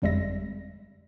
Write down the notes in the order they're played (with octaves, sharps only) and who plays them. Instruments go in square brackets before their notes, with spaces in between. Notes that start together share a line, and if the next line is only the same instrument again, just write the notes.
[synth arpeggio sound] G1 F2 G3 G#3 E5 A#6